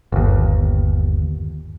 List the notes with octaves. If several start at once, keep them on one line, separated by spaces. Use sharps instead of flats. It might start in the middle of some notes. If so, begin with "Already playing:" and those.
G1 D#2